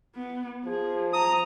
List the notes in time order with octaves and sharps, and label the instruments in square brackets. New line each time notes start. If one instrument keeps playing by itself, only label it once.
[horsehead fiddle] B3
[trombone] F3 [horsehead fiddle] G#4
[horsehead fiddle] A#5 [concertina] D#6